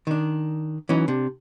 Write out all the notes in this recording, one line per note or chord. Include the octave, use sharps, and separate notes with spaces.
D#3 D4
E3 F#3 C#4 D#4
C3 D4